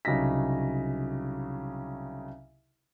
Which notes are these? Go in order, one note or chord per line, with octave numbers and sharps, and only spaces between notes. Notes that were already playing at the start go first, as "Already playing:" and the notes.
C2 C#3 F#3 D#4 A#6 B6